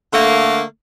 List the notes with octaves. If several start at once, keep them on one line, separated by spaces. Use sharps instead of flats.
D3 A3 A#3